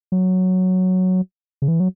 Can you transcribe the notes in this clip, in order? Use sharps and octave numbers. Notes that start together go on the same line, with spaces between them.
F#3
C#3
E3
F#3